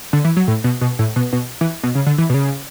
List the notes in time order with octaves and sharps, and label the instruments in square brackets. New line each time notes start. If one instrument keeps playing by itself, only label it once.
[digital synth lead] D3
E3
F#3
A2
B2
B2
A2
B2
B2
E3
B2
C#3
D3
E3
B2
C#3